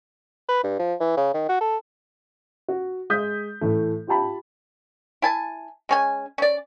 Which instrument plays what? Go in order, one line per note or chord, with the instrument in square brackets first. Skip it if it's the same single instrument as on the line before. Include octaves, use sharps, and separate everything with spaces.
[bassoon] B4
G2
F3
E3
C#3
D#3
F#4
A4
[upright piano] F#4
G#3 D#6 G6 B6
A2 E3 A3
F4 G4 G5 A5 B5
[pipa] E4 G#5 A5
G#3 C#4 G#5
C#4 D5